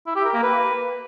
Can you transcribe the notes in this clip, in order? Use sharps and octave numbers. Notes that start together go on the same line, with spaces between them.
E4
G4
A#4
A#3
B4